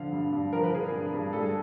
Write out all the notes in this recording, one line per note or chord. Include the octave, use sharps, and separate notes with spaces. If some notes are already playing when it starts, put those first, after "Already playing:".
Already playing: D3 F3 F5
G2
G2
F3 A#4
B4
D3 G#4 A#4
G2
G2
G3 A4
G#4